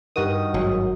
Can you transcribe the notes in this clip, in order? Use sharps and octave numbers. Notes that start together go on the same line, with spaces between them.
G2 D#3 F#4 D#6
G#1 F#3